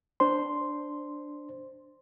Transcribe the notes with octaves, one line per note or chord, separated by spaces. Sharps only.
D4 C5 C6